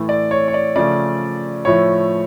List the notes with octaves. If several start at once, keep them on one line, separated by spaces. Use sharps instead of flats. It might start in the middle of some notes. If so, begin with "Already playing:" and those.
Already playing: A2 E3 A3
D5
C#5
C#5
D5
C#3 F3 A3 D5
A2 F3 A3 C#5